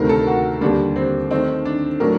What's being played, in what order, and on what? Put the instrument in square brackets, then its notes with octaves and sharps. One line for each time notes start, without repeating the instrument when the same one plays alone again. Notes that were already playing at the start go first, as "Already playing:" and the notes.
Already playing: [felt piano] D2 C3 D#3 A3 [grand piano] A#4
[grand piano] A4
F#4
[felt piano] D#2 D3 G3 [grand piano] D4
[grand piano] C4
[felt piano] D#3 A3 D#4 [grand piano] C4
[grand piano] D4
[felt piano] A2 F#3 A3 D4 [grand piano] A#4